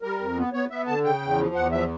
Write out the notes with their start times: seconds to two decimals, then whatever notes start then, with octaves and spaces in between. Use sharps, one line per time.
0.02 G3 A#4
0.20 F2
0.37 B3
0.53 B3 C#5
0.70 B3 E5
0.87 D3 A5
1.04 C#3 G5
1.22 E2
1.38 F3
1.55 E2 F#5
1.72 F3 E5